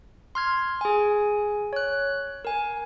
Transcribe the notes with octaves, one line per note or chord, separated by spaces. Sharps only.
C6 F6 G#6
G#4 G#5
C#5 F#6
A#4 G#5